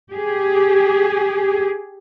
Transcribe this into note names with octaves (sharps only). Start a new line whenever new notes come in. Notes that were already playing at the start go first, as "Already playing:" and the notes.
G4 G#4